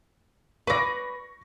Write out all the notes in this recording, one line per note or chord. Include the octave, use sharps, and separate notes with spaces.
B4 D5 C#6 A#6